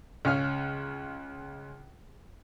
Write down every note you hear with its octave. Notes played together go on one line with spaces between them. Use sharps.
C#2 C#4 F5 F6